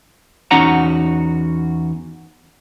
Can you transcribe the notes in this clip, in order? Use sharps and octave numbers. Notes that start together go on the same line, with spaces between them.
E2 C#4 D#4 F#4 F#5 A#5